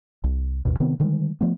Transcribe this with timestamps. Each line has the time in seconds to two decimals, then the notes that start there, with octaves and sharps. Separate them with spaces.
0.24 C2
0.65 A1 D#2 B2
0.80 C3 D#3 B3 C4
1.00 D3 D#3 G3 G#3
1.41 F3 A3 B3